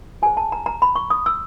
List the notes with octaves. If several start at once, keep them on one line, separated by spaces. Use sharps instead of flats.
F4 G#4 C5 G#5
A5
A#5
A#5
B5
C#6
D#6
E6